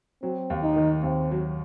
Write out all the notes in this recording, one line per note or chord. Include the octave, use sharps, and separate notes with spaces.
F#3 C4
D#2
D#4
D#3
D#2 C4
F#3